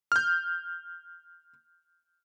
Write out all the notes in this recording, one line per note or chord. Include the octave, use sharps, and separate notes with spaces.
F6 G6